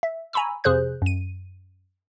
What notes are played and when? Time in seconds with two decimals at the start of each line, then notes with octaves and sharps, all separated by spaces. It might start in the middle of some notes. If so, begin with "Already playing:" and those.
0.03 E5
0.33 G#5 A#5 B5 C#6 E6
0.64 F2 C3 G#4 C5 F#6 G6
1.02 F#2 D#7